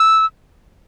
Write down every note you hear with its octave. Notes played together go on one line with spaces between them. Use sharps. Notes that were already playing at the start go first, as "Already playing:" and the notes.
Already playing: E6